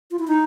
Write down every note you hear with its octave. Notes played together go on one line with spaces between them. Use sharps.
F4
E4
D#4